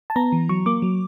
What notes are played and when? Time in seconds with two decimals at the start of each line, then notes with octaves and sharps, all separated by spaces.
0.10 A5
0.16 B3 A#5
0.32 E3
0.49 F#3 C#6
0.66 A#3 D6
0.82 F#3